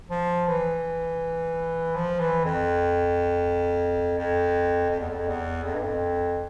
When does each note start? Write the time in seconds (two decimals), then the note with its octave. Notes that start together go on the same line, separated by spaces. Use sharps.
0.10 F3
0.48 E3
1.95 F3
2.20 E3
2.45 F2
4.18 F2
4.90 F2
5.00 E2
5.09 F2
5.28 E2
5.64 F2
5.74 G2
5.83 F2